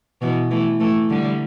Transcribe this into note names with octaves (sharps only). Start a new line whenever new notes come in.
B2 E3
E3 A3
E3 A3
D3 G3